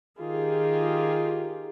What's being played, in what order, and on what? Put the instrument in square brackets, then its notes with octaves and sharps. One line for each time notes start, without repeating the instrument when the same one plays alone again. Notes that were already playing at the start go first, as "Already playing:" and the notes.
[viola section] D#3 F4 G4 G#4